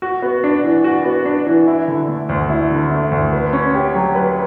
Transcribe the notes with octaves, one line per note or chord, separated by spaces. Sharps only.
F#4
B3
D4
E3
F#4
B3
D4
E3
E4
D3
A3
D2
E4
D3
A3
D2
B4
C#4
G4
F#3
B4